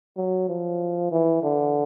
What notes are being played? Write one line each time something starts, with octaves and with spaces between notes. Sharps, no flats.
F#3
F3
E3
D3